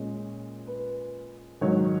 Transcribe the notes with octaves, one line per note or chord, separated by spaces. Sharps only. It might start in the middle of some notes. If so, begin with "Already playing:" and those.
Already playing: A#2 G#3 C#4 C#5
B4
G#2 D#3 F#3 C#5